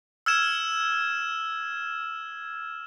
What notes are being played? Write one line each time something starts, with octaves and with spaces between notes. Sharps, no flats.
E6 F6 G#6 E7